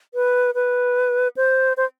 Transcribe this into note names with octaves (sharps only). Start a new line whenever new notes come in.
B4
B4
C5
C5